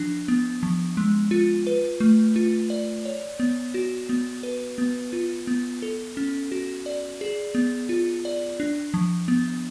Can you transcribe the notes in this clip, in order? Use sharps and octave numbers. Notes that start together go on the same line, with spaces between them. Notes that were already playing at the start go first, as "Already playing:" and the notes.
Already playing: F3 D4
B3
F3
G#3
F4
B4
A3
F4
D5
C#5
B3
F#4
B3
B4
B3
F4
B3
A4
C#4
F#4
D5
G#4
B3
F4
D5
D4
F3
B3